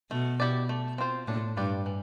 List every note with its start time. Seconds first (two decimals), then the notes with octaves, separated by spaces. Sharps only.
0.11 B2 A3
0.40 E4 G4 D5
0.69 A3
0.98 C4 F4 C5
1.27 A2 D4
1.57 G2 G4 B4 D5
1.86 E3